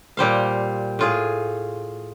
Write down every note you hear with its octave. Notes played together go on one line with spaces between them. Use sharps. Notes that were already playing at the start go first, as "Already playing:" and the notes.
A#2 G3 C5 F5
A2 F4 G#4